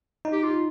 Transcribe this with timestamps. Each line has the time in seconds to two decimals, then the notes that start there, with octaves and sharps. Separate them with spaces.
0.25 D#4
0.32 G4
0.43 F4